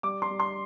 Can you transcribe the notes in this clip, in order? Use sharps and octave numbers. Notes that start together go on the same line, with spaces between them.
G3 D6
C6
G3
C6